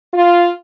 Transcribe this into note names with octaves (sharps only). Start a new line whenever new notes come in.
F4